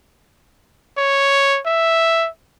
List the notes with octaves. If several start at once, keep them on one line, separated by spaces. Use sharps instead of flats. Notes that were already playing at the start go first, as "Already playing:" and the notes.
C#5
E5